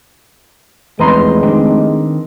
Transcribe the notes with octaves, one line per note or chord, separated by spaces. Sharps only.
F1 E2 G#3 B4 D#5 A#5 C6
D#3 C4 D4